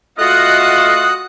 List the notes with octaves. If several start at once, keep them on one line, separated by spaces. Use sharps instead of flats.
A3 F4 F#4 D#5 F#5 D#6 F#6